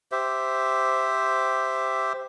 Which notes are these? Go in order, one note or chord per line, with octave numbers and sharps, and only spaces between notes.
G4 C5 E5